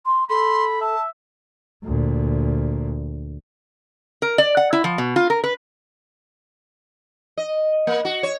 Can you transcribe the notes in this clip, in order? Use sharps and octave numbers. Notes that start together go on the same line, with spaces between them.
C6
A4 B5 C6
E5 A5
D2 A#2
A#4
D5
F#5
E4
F3
B2
F4
A#4
B4
D#5
A#3
F#4
C#5